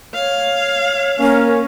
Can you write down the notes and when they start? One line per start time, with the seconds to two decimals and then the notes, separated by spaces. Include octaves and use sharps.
0.14 C#5 F5
1.19 A#3 C#4 A#4